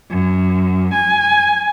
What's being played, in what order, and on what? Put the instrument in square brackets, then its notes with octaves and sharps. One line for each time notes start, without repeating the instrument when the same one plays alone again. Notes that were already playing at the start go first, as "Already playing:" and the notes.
[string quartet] F#2
G#5